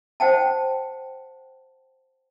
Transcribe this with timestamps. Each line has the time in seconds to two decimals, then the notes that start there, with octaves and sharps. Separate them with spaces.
0.20 C5 F#5 G5 A5